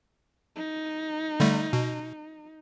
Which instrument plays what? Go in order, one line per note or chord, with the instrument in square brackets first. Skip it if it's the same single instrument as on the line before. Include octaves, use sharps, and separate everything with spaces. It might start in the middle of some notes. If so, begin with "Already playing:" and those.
[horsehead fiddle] D#4
[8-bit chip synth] D3 G3 A3
B2